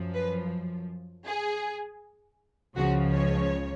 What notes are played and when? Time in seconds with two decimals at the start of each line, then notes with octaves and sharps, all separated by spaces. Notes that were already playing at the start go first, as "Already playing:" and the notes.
Already playing: F#2 F3
0.14 B4
1.26 G#4
2.76 C#2 C#3 F3 F#4
3.13 C#5